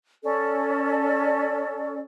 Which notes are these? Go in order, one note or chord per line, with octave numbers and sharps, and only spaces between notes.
C#4 A4 D5